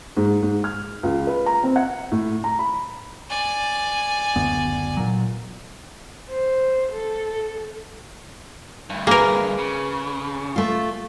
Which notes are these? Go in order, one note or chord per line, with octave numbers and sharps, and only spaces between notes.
G#2
G#2
F6
C#2
B4
A#5
C4
F#5
A2
A#5
B5
D5 G#5
F#1 D2 B3
A#2 F#3
C5
A4
D2 G2
A#3 G#4 A#4 B4
C#3
A3 F4